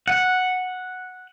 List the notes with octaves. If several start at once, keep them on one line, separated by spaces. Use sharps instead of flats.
F#5